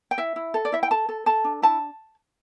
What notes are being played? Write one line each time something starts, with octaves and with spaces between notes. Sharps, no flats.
G5
E4 E5
E4
A4
D5
E4 E5
G5
A4 A5
A4
A4 A5
D4
E4 A5